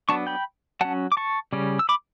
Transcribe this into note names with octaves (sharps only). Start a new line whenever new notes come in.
F#3 B3 D4 A5 C#6
G5 B5
F#3 C#4 F#5 A5
D6
A5 C#6
C#3 G3 C#4
E6
B5 D6